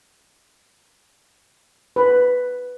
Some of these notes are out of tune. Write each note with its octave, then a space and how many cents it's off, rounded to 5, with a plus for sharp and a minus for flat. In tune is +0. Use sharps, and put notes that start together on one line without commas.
B4 +5